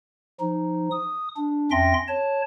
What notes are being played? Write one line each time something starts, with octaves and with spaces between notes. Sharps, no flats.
F3 D#4
D#6
D4
F2 C#4 E5 G5 C6 A#6
C#5 A5